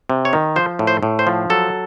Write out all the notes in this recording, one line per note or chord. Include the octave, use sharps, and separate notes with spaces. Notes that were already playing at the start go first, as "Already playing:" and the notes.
C3
C#5
D#3
F3 C5
A2
C5
A2
C5
F3
F#3 A4